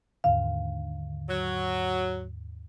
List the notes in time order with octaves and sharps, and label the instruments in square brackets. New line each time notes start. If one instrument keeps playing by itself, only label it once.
[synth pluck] D#2 G#2 D3 [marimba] F5
[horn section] F#3